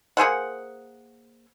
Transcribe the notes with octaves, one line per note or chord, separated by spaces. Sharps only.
A#3 G#4 C5 F#5